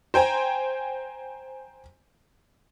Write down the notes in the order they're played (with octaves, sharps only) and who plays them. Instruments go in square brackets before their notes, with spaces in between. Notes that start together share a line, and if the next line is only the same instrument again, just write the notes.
[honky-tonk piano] C5 G5 G#5 A#5